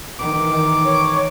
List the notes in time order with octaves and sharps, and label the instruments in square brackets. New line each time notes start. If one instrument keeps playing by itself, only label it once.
[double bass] D#3 E3 [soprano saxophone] D6
[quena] C#5